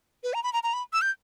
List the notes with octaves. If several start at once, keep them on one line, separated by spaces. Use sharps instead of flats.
B4
A#5
B5
A#5
A#5
B5
E6
G6